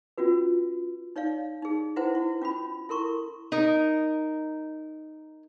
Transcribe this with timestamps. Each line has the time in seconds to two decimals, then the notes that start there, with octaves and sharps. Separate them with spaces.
0.18 C#4 F4 F#4 B4
1.16 D#4 C#5 D5 F5
1.62 D#4 G#4
1.96 E4 F#4 B4 C5 F#5
2.15 E4 F#4
2.42 C#4 F4 F#4 B5
2.89 E4 A4 A#4 C6 C#6
3.52 D#4 A#4